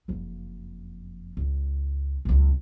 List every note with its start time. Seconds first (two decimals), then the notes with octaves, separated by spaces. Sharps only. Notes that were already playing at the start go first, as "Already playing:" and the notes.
0.08 F#1 F2
1.37 C#2
2.25 C#2 F#2